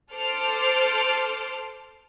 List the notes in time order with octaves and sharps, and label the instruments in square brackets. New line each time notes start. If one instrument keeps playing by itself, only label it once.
[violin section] A4 C5 A5 D6 F6